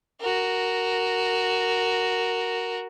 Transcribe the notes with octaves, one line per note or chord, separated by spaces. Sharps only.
F#4 A#4